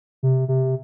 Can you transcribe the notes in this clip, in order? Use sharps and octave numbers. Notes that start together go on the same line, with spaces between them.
C3
C3